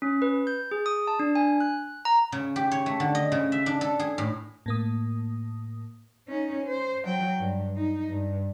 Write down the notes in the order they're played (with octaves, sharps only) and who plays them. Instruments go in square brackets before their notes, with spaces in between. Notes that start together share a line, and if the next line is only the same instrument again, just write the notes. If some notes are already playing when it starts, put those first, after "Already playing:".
[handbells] C#4
B4
G6
G#4
D#6
A5
D4
G#5
F#6
A#5
[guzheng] C#3
G4
C#5
A3
D3
D#5
C#3
E5
D4
A4
G#4
A2
[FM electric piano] A2 A#3 D#6
[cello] C#4 D#4
C5
F#3 G5
G2
D#4
G2